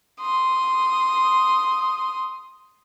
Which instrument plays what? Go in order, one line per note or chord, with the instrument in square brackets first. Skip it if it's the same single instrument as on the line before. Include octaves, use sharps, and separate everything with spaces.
[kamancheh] C6 D#6